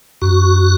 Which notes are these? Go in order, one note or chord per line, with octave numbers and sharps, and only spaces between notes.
F#2 F#4